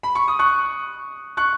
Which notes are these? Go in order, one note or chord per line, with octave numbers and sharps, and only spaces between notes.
B5
C#6
D#6
C#6 F#6
C#6 F#6